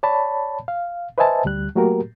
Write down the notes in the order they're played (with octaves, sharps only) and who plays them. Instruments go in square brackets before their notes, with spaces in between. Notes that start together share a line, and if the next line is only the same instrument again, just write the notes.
[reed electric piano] C#5 D5 A5 B5
F5
B4 C5 D#5 E5 G#5 A5
D2 G3 F#6
F#3 A3 A#3 F#4 G4 A#4